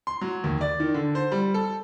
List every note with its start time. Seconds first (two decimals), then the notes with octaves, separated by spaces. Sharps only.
0.07 C6
0.21 F#3
0.44 D#2
0.61 D5
0.80 D#3
0.94 D3
1.15 C5
1.32 G3
1.54 A4